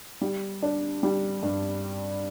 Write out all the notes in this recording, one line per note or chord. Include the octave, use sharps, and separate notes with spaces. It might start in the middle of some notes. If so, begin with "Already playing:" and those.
G3
D4
G3
G2